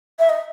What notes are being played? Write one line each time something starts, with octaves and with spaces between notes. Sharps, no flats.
E5
D#5